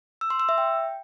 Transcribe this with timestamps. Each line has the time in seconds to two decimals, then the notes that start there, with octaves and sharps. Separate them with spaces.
0.21 E6
0.30 C6
0.40 E6
0.49 E5
0.58 G5